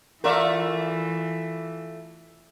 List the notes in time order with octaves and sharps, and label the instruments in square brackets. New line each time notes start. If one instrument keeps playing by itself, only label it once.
[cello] E3 [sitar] A3 F4 E5 [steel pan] A#4 D5